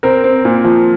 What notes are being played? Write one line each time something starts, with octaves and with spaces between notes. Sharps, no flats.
C4 A#4
C4
A#2
F3